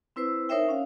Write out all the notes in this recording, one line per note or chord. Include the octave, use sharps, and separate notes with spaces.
C4 E4 B4 C5 E6
D#4 A#4 C5 C#5 E5 G5
C#4 F5